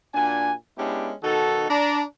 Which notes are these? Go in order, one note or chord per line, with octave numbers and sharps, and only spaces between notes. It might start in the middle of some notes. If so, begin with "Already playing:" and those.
A#2 D4 F#4 G#5
G#3 B3 C#4 D4 E4 G4
B2 D#3 D#4 F#4 A4
D4 A#5